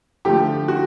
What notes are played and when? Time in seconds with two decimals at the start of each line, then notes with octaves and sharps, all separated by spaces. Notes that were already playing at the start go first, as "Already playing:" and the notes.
0.25 D3 F3 A3 G4
0.68 F#4